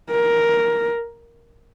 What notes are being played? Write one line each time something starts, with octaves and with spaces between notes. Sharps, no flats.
A#4